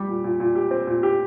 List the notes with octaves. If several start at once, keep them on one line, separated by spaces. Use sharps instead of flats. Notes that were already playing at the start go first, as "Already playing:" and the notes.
Already playing: G3 G4
A#2
A#2
A#2
G4
C4
A#2
G4